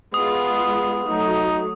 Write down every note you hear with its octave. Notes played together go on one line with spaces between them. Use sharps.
G#3 B3 F4 D#6
F#3 A3 D#4